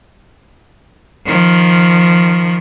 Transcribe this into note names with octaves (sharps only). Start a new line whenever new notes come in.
D#3 F3